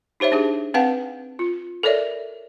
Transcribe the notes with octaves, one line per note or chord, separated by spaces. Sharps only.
D#4 G4 C5 C#5 E5
D4 G4 G#4
C4 B4 F5 F#5 A5
F4
A4 A#4 C#5 D5 E5